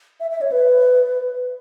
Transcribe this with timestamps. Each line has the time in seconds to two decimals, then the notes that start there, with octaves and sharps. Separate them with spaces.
0.20 E5
0.31 E5
0.41 C#5
0.52 B4